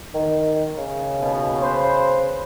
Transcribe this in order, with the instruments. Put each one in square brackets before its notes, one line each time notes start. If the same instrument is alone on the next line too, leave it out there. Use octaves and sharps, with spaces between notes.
[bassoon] D#3
C#3
[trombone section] D#2 B2
B4 C5